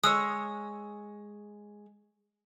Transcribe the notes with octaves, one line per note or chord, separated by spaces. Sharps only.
G#3 C#5 D#6 E6